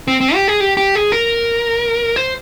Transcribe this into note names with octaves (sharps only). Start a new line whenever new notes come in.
C4
C4
G4
G#4
G4
G4
G#4
A#4
C5